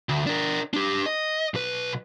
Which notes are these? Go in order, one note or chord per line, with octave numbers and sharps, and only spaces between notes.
D2
D4 A#4
D4 G4
D#5
B1 B4